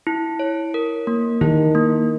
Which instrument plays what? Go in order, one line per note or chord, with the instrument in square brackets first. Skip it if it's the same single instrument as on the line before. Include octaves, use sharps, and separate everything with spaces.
[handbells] E4
C#5
A#4
A#3
[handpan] D#3 [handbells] E4
[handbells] A#3